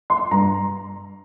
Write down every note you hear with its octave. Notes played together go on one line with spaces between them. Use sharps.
C6
G2 A#5